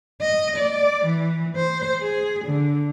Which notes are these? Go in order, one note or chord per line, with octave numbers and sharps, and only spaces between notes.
D#5
D5
E3
C5
G#4
D3